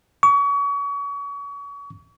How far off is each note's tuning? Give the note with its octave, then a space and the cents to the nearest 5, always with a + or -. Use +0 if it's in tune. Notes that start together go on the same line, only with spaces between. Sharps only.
C#6 +35